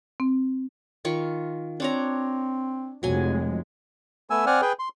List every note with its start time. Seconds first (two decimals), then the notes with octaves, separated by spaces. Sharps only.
0.20 C4
1.05 D#3 F4 C#6
1.80 C4 D4 C#5 A#5
3.03 F1 F#3 G#3 G#5
4.30 A3 B3 G#5 E6
4.46 C4 D5 F#5 G#5 F6
4.62 G#4 B4 G5
4.79 C6